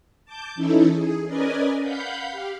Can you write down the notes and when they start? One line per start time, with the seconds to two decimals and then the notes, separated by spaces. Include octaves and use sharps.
0.25 A5 D6 G6
0.55 E3 C#4 D#4 E4 A4
0.92 G#4
1.26 C#4 A#4 B4 D5 D#5 G#5
1.81 F5 F#5 B5 G6
2.28 G4 F5